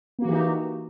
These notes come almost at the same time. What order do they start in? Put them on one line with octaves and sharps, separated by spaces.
A#3 F#4 E3 G4 D#4